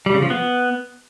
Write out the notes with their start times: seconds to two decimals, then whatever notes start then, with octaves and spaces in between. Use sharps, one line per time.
0.06 G3
0.14 C#3
0.22 F3
0.30 B3